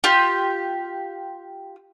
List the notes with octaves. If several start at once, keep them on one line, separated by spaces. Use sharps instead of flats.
F4 G4